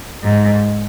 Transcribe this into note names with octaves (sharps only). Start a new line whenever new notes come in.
G#2